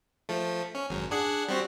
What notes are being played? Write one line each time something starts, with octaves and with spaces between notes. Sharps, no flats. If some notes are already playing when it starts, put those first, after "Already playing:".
F3 A3
C#4
G#1 F#2
D4 G#4 F#5
G3 C4 F#4